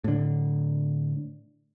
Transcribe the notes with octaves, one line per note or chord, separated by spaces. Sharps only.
A2 D3